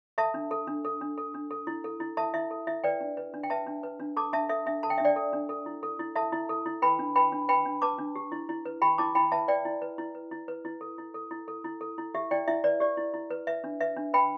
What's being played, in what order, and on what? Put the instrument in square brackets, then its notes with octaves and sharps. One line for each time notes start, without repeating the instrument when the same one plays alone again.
[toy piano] A4 E5 A5
D4
A4
D4
A4
D4
A4
D4
A4
E4
A4
E4
A4 E5 A5
E4 E5
A4
E4 E5
B4 D5 G5
D4
B4
D4
G5
B4 E5 A5
D4
B4
D4
A4 A5 D6
D4 E5 A5
A4 E5
D4 E5
A4 A5
G5
D4 E5
D5 G5
A4
D4
A4
E4
A4
E4
A4 E5 A5
E4
A4
E4
B4 G5 B5
D4
B4 G5 B5
D4
B4 G5 B5
D4
B4 A5 D6
D4
G4
E4
E4
B4
G4 G5 B5
E4 A5 D6
E4 G5 B5
B4 E5 A5
B4 D5 G5
E4
B4
E4
B4
E4
B4
E4
A4
E4
A4
E4
A4
E4
A4
E4
G4 E5
E4 D5 G5
E4 E5
B4 D5
G4 D5
E4
E4
B4
B4 E5
D4
B4 E5
D4
B4 G5 B5